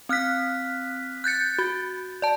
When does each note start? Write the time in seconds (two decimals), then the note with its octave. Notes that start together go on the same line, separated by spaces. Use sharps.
0.09 C4 F6 F#6 B6
1.24 F#6 G6 A6 C#7
1.59 F#4
2.22 D5 A5